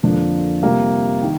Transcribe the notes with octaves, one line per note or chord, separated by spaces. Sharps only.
F2 D3 F3 A#3 D4
C3 G3 A#3 F4
D#3